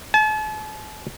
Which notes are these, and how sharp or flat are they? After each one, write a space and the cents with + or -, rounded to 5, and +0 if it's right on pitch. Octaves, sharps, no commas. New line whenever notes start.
A5 -40